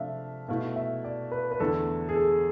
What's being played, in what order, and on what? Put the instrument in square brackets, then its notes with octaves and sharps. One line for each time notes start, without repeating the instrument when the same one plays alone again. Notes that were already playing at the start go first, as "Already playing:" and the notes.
Already playing: [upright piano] C3 F3 A3 D4 [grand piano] D5 E5 F5
[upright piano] B2 A3 E4 [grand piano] F5
[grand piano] E5
D5
B4
B4
[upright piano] E2 D3 A3 D4 [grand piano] A4
[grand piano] G#4
A4